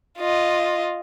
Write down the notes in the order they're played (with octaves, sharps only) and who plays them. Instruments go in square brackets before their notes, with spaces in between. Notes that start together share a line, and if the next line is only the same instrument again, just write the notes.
[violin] F4 D#5